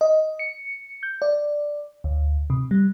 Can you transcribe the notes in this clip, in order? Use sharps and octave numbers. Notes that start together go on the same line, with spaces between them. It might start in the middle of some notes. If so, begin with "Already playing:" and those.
D#5
C#7
G6
D5
D2
C3
G3